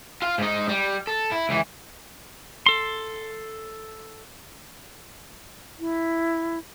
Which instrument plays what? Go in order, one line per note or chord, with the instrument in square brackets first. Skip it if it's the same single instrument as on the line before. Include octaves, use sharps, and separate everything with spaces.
[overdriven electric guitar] F4 F5
G#2 D#4
G3
A4
E4
C#2 E3
[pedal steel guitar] A4 C6
[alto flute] E4